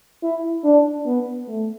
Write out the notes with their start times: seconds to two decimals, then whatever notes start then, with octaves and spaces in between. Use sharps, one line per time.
0.23 E4
0.64 D4
1.06 B3
1.48 A3